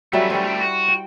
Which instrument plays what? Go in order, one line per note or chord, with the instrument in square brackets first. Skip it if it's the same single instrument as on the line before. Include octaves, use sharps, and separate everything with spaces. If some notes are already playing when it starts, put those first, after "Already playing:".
[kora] F#3 G3 E4 [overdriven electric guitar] A3 C#4
[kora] G3 C5
[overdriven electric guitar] A3 G4
F#4
[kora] G5